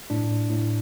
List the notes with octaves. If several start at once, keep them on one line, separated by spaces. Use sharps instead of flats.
A2 D4
A2
A2